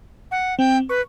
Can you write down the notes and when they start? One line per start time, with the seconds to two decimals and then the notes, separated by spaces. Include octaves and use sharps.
0.31 F#5
0.59 C4 G5
0.89 B4 C#6